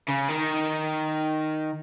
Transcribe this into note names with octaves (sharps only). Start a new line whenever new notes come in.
C#3
D#3